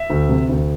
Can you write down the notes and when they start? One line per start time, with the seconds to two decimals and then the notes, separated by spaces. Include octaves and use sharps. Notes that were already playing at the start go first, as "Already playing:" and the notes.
Already playing: E5
0.10 D2
0.29 C3
0.49 D2